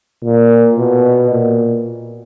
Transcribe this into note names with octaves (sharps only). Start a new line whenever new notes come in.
A#2
B2
A#2